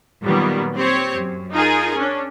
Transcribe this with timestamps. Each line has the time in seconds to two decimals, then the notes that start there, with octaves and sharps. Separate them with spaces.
0.23 A#2 D#3 F#3 G3 A#3 B3
0.75 C4 G4 C5 C#5
1.14 F#2
1.52 D#4 F4 G#4 A#4
1.95 C#4 D4